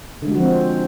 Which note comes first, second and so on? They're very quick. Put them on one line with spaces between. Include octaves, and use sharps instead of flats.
D3 G#3 F#4 F3 C4